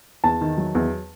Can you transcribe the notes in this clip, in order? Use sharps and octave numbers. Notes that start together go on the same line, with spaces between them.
E2 A5
D#3
F#3
E2